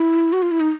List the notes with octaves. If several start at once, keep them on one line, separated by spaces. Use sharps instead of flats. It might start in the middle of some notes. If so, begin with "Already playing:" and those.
Already playing: E4
F#4
F4
E4
D#4